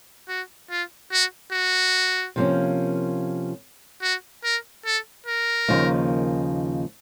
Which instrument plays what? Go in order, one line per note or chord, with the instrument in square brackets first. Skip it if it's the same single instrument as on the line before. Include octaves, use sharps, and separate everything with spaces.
[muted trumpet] F#4
F4
F#4
F#4
[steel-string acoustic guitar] C3 F3 A#3 C#4
[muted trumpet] F#4
A#4
A4
A#4
[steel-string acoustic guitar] D#2 C#3 F3 A#3 D#4